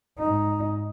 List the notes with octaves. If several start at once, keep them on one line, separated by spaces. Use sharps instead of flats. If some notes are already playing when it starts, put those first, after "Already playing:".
G#2 D#4